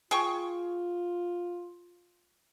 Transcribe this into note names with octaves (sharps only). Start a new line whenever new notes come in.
F4 G#4 G5 C#6